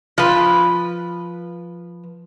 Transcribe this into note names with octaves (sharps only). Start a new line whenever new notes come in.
F3 B4